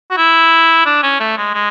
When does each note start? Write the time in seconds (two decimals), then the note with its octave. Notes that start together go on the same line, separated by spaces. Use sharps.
0.11 F#4
0.17 E4
0.86 D4
1.03 C#4
1.20 A3
1.38 G#3
1.54 G#3